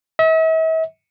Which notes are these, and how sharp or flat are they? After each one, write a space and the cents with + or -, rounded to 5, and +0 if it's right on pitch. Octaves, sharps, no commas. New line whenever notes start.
E5 -45